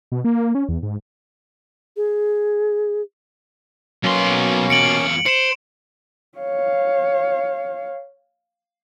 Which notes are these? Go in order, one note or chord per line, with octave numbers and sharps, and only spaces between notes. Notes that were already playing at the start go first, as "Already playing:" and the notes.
B2
A#3
C#4
E2
G#2
G#4
B2 F#3 A#3 B3 C#4 C6
E2 F4 C#7 D7 F#7
C5 C#7 E7
C#5 F5